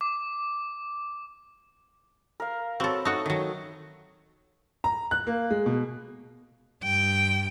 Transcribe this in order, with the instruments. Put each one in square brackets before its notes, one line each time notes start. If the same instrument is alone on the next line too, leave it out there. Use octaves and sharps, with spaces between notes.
[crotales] D6
[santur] A#4 F5
[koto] C4 A4 [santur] F#4 B4 C#5
[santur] A3 [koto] D#4 F#4 F#5
[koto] D#3 F#3 [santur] D#5
[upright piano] A#5
F#6
A#3
G#3
B2
[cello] G2 G5